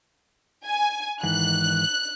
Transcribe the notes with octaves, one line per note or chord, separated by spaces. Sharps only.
G#5
G#2 D#3 E3 F#6